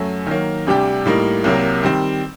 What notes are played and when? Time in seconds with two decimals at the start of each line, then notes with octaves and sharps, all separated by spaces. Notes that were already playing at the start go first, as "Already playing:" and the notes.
Already playing: F#2 F#3 A3
0.27 D#3 F#3 A#3
0.67 D2 C3 G3 D4 G4
1.06 A2 G3 A#3 D#4
1.44 C2 C3 F#3 A#3
1.83 D#3 G3 C4